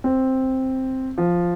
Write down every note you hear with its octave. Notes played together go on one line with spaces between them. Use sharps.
C4
F3